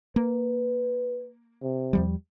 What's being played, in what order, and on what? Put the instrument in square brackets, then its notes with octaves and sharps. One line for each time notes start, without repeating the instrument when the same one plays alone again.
[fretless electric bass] A#3 [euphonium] B4
[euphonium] C3
[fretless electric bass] E2 F3 G3